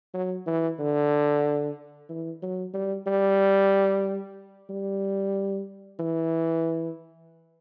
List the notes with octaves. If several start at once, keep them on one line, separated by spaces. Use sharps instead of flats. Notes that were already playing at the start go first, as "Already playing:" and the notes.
F#3
E3
D3
E3
F#3
G3
G3
G3
E3